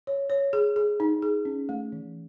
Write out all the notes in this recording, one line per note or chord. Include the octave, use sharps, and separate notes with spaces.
C#5
C#5
G#4
G#4
D#4
G#4
C#4
A3
E3